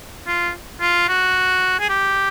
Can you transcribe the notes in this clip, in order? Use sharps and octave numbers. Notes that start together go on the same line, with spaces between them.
F4
F4
F#4
G#4
G4